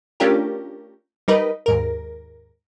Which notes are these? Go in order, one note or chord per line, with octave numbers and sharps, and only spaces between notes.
A3 C#4 D4 F4 G4 A#4
G3 D#4 A#4 B4 D#5
D#2 G#2 A#4